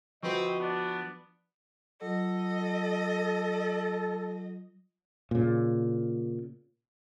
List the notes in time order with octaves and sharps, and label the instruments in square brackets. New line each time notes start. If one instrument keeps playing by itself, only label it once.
[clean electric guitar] F3 B4 [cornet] C4 [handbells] F#4 C#6 [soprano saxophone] D#5
[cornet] B3 [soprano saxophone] D4
[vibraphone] F#3 F4 [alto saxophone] A4 [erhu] D#5
[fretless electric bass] A#2 C#3